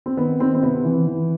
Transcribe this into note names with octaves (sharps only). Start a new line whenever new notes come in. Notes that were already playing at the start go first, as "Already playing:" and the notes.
C4
D#3 B3
D#3 C4
C4
C3 B3
E3
E3